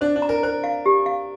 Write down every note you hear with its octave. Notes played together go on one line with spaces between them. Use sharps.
D4 C5
D4
A#5
A#4
A#4 C5
F5
G4
F5